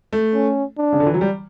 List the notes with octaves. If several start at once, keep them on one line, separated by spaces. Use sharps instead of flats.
A3
C#4
D4
C#3
D3
E3
F#3
G3